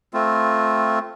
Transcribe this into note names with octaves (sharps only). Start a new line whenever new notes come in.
A3 C4 F4